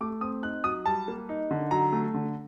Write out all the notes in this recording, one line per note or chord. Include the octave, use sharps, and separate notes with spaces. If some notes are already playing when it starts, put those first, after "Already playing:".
A3 D6
C4 D#6
D#4 F#6
F#3 D#6
G3 A5
A#3
D#4
D3
F#3 A#5
A3
D3